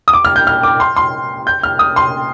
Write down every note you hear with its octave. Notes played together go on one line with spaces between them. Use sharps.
D#6
D6
F6
G6
F6
D6
C6
C6
G6
F6
D#6
C6